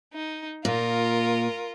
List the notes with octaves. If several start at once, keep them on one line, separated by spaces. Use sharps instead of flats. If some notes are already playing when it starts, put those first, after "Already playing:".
D#4
A#2 F4 A#4